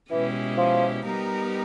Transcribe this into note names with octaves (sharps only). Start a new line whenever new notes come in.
B2 E3 G#3 C#4 E4 G4
F3
G3 B3 D#4 G4 A#4